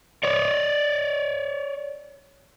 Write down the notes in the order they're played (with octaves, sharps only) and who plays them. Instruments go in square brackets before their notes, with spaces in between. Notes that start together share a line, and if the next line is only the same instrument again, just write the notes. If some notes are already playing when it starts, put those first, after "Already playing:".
[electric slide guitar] C#5 D5